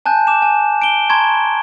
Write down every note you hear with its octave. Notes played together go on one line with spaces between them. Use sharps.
G#5 A5 F#6 G6
D6 E7
G#5
D7 G7
A5 A#5 C6 C#6 G#6